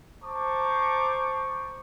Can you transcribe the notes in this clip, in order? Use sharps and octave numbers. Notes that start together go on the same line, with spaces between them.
C5 A5 A#5 C#6 D6